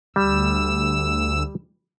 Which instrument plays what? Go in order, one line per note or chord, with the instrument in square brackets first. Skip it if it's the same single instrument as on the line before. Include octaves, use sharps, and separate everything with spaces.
[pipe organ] D2 E6 [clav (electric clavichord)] G3